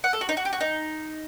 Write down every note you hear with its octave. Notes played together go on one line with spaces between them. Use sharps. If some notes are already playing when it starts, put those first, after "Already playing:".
F#5
A4
F#4
D#4
F#4
G4
F#4
D#4